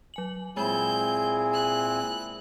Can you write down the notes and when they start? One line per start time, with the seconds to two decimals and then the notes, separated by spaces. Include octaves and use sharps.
0.14 F#3 G#5 F#7
0.57 A#2 G#3 C4 E4 G#4 B5 G6
1.53 F#6